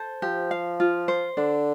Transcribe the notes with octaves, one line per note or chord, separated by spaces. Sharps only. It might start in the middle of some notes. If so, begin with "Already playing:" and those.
Already playing: A4 C5
F3 G4
F5
F4
C5
D3 D4